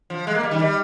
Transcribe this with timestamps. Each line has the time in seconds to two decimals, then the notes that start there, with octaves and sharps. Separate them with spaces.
0.10 F3
0.27 G#3
0.35 A#3
0.43 G3
0.51 D#3
0.60 G3